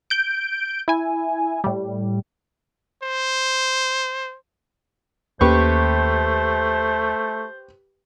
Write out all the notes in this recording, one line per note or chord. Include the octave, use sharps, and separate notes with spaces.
G6 D7
E4 G#5
A2 G3
C5
D#2 A3 A#3 C#4 G4 B4 C5 C#6